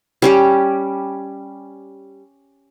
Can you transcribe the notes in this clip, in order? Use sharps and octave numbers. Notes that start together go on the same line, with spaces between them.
G3 C#4 G4